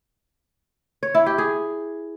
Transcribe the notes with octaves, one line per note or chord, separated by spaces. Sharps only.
C#5
E4
G4
G#4